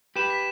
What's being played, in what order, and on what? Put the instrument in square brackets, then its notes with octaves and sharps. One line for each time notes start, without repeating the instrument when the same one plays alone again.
[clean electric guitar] G4 B4 [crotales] E7
[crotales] B6